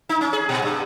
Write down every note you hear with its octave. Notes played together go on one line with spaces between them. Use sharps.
D#4
C#4
G#4
A#2
G2